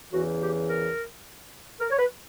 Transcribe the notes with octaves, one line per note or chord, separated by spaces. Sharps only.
E2 C#3 E3 F#4
G4
A#4
A#4
C#5
B4